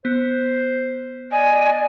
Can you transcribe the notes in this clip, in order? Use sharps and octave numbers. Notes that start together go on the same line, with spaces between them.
B3 C5
D5 D#5 G#5